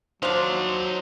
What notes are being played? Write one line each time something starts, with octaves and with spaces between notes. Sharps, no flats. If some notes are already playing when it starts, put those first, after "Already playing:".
F3 F#3 D4 D#4 C5 F5